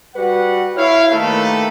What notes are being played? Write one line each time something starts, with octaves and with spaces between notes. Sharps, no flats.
G3 F#4 B4 F#5
E4 C#5 F5
D#3 A3 A#3 G4 A4 B4